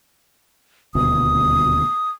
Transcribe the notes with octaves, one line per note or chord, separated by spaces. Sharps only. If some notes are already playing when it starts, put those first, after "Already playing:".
D#1 D2 B2 D#6